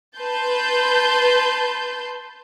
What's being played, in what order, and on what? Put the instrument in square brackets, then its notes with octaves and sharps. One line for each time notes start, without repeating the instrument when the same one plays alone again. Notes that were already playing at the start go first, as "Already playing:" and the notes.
[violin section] B4 A5 C6 G6